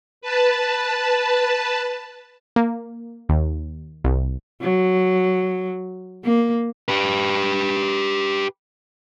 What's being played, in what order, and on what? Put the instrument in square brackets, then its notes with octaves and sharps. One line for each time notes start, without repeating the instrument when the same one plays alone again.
[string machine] B4 A5
[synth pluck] A#3
D#2
C2
[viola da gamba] F#3
A#3
[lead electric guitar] G4 B4